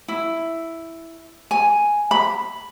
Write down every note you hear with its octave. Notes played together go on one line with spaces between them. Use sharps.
E4
G#5
B5